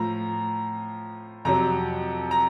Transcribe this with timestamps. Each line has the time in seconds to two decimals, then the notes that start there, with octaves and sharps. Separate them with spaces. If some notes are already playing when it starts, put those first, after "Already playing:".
Already playing: A2 F3 A#5
1.45 F2 C3 F#3 A#5
2.31 A#5